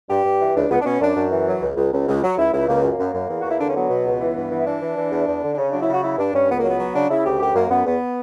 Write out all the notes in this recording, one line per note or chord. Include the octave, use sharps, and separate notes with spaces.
G2 G4
G2
E3
C#2 D4
C#2 B3
D4
B2 C#4
F#2 D4
F#2
E3
F#3
C#2
C#2
C#2
C#2
F#3
C#2 E4
C#2 E4
C#2 A#3
F#2
A#3
F#2
F#2
E2
F#4
E2 E4
D3 D4
C#4
F#3 B3
B2
C#2
E3
G2
E3
E4
E3 D4
E3
E3
E2
E2
D3
D4
C#3 C#4
F#3 D4
E4
C#3 F#4
F#3 E4
G2 D4
G2 C#4
C#2 B3
F#3 A#3
B3
F#3
C#3 D4
C#3 E4
D2 G4
F#2 G4
F#2 A#3
F#2 B3
E2 B3